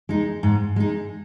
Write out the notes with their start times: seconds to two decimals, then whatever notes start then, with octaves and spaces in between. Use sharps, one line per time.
0.09 G#3 D#4
0.43 G#2
0.76 G#3 D#4